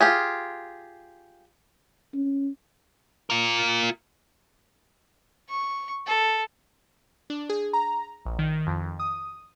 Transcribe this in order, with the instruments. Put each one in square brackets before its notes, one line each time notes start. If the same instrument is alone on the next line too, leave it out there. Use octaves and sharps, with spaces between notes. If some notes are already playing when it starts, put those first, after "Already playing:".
[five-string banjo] F4 G4 G#4
[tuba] C#4
[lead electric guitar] F4 A#4
[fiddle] C#6
A4
[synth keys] D4
G#4
A#5
A#1
D#3
F2
D#6